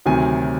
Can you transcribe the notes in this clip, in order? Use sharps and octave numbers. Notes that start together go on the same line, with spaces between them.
D2 C3 D#3 F#3 G#5